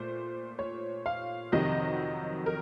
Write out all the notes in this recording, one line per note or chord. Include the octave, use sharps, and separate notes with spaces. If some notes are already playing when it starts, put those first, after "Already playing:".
Already playing: A#2 A3 C5
C#5
F5
F2 C3 D#3 F#3 D#5
A#4